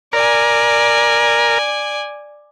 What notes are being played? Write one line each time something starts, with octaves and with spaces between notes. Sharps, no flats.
A#4 D5 G#5